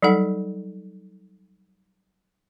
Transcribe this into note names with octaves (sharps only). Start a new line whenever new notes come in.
F#3 G3 D#4 A4 F#5